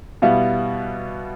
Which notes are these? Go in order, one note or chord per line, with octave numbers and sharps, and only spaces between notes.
B2 G3 B3 E4 F5